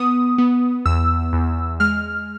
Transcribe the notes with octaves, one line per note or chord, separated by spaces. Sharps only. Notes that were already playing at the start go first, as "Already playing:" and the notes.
Already playing: B3 D#6
B3
E2 E6
E2
G#3 F6